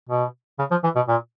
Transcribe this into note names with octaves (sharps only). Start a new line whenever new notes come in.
B2
C#3
F3
E3
B2
A#2